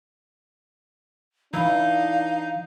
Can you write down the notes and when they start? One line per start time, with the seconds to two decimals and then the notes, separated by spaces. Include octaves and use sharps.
1.54 E3 D4 D#4 F5